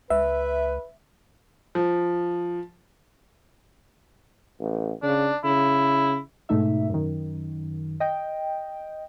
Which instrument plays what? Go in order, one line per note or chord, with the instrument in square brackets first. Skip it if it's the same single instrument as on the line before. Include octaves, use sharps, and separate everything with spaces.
[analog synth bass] C#2 [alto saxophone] B4 [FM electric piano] E5
[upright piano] F3
[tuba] A1
[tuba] C#3 [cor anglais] D4
[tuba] C#3 [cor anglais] E4
[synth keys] G#2 B2 A3 D#4 E5
F#2 D#3
D#5 G5